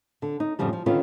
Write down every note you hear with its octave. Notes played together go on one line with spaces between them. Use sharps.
D3
D#4
F2 A2 C#3 F3 G3
F3
D3 D#3 C#4 F4 B4